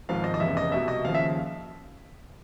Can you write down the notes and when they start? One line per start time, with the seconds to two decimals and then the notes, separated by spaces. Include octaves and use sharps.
0.09 G#1 G#2 F3 F5
0.24 D#5
0.34 D#5
0.40 F1 E2 C#3 E5
0.57 D#5
0.72 C2 B2 E5
0.88 D#5
1.04 D#2 C#3 F3 F5
1.15 E5